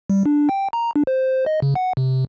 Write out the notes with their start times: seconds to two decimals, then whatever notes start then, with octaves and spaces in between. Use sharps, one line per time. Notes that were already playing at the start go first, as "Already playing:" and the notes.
0.10 G3
0.26 D4
0.49 G5
0.73 A#5
0.96 D4
1.07 C5
1.46 D#5
1.62 C#3
1.75 F#5
1.97 C3